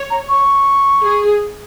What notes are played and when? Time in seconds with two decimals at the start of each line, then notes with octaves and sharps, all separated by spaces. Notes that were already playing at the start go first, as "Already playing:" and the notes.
Already playing: C#5
0.10 A#5
0.29 C#6
1.03 G#4